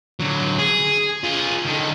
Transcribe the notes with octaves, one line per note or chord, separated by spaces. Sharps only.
D3 F#3
G#4
F4 G#4
D3 D#3